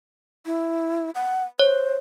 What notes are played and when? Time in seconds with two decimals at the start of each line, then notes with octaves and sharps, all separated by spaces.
0.46 E4
1.15 F#5
1.59 C5 C#5